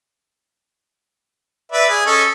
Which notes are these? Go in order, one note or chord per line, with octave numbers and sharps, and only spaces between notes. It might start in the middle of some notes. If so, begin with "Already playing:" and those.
B4 D5 E5
G#4
C#4 A4 D#5